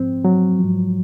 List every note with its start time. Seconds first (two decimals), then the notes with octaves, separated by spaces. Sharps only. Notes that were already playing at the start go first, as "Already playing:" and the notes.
Already playing: G#2 F3 C4
0.25 F#3
0.59 G#2 F3